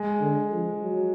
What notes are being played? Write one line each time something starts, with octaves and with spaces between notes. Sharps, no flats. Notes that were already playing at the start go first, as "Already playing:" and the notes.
Already playing: G#3
D3
F3
F#3